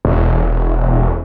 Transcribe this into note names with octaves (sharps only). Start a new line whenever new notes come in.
E1